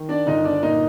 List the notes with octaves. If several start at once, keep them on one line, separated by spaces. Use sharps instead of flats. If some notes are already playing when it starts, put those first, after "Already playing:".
Already playing: D#3
D4 D5
G1 D#4 D#5
D4 D5
A#2 D#4 D#5